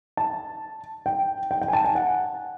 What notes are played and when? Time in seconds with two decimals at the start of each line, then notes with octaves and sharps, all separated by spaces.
0.17 A5
1.06 G5
1.51 G5
1.61 G5
1.68 G#5
1.73 A5
1.85 G#5
1.95 F#5